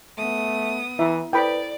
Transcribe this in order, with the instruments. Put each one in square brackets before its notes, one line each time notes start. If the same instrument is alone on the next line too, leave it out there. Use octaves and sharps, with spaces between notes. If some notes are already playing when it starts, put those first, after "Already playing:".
[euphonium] A3 [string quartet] B3 D#6
[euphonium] E3 [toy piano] E4 [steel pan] E5
[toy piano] E4 A4 C5 [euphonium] B4 [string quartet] D5 [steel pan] G5 B5